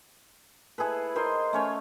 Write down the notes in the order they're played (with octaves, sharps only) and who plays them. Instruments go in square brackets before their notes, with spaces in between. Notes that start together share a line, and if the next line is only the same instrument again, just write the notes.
[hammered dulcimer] E4 G#4 A4 B4
A#4 C5 D#5 C6
A3 C#4 C#5